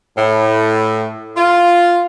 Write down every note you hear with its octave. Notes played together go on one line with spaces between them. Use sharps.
A2
F4